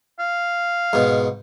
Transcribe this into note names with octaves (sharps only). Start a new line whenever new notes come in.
F5
G#2 B2